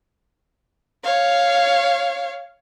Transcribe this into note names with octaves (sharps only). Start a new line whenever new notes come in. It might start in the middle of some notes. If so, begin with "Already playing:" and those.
C#5 F5